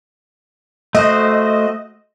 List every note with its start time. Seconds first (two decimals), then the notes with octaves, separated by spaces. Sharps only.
0.95 A3 F#4 C5 D#5